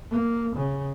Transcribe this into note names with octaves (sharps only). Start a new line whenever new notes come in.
A#3
C#3